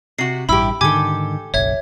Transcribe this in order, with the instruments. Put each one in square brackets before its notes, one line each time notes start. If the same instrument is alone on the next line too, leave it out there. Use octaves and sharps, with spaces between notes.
[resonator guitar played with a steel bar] C3 F#4 [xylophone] C7
[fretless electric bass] A1 G2 [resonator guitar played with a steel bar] E4 G4 [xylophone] B5 E6
[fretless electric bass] G#2 D3 D#3 [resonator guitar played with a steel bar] G4 A4 [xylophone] G#5 D6 G#6
[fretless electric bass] F#1 B1 [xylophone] C#5 E5 G#6